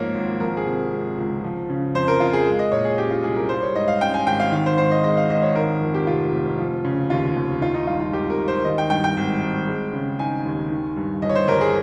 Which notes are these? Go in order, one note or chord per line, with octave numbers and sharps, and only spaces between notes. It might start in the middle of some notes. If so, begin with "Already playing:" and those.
Already playing: G#2 F3 A#3 A#4 C#5
G#1
F3 A#4
G#4
C3
G#3
C#2
F3
C#3
F2 C5
A#4
F2 F4
G#4
G#3
D#5
A#2 C#5
G#4
C#4 G4
F4
C2 G#4
A#4
G3 C5
C#5
G#2 D#5
F5
C#4 G5
G#5
G#1 G5
F5
D#3 F5
C5
G#2 C5
D#5
G#3 D#5
F5
G#1 D#5
C#5
D#3 A#4
F2
G4
F1 F4
F1
F3
C#3
D#2 F4
D#2
D#3 F4
D#4
G2 F4
F4
G#1 G4
A#4
G#1
C5
D#3 D#5
G5
G2 G5
G5
G#1
G#1
G#3
C#3
D#4 G#5
D#2
D#3
G2
G1 D#5
C#5
C5
G1 A#4
G#4